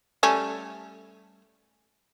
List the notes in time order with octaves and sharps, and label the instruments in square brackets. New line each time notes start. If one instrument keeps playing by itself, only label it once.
[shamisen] G3 A3 C#4